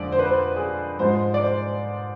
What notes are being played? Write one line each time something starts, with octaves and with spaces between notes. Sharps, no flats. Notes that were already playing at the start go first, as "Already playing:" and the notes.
Already playing: F2 D3 G#3 D5
C5
B4
C5
G#4
G#2 F3 G#3 C5
D5
C5